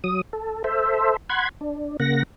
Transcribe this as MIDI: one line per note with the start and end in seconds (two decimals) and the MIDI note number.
0.04 0.21 54
0.04 0.21 87
0.33 0.63 69
0.64 1.16 69
0.64 1.16 72
0.64 1.16 76
1.30 1.49 78
1.30 1.49 83
1.30 1.49 84
1.30 1.49 92
1.61 1.97 62
2.00 2.23 49
2.00 2.23 58
2.00 2.23 78
2.00 2.23 94